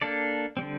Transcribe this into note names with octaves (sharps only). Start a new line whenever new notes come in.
A#3 D4 A4 D5
D3 G3 C4